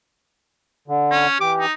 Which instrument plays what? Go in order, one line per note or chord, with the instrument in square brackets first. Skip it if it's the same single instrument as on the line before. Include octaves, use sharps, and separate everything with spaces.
[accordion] D3
[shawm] C#4
[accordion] E3 G4 [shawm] D6
[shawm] D#4